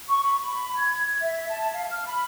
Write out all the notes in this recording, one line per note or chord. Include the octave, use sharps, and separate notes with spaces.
C#6
B5
B5
G#6
E5
A5
F5
F6
B5